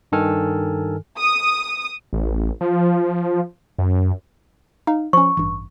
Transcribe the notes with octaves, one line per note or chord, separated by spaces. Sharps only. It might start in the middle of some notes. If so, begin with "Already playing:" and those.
G2 D#3 A4 G#5 F6
D#6
A1
F3
F#2
D#4 F5
F3 C#4 C#6
A1 G2